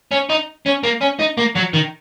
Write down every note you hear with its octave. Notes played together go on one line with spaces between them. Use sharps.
C#4
D#4
C#4
A#3
C#4
D#4
A#3
F#3
D#3